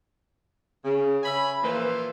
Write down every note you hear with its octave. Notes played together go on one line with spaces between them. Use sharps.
C#3
C#5 E5 G#5 B5
A#2 E3 F3 A#3 B4 C5